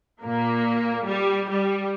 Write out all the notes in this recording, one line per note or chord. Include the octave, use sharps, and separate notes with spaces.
A#2 A#3
G3
G3